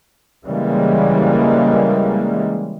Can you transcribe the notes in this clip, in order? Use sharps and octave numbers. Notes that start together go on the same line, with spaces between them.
C#3 E3 G3 G#3 A#3